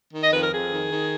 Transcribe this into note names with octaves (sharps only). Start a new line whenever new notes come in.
D#3
D#5
F2 B4
A#4
F2 G#4
D#3
D#3